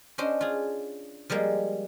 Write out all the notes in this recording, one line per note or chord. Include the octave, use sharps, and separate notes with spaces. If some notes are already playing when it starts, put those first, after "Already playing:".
C#4 D4 C5 D#5
F4 G#4
F3 G3 G#3 A#3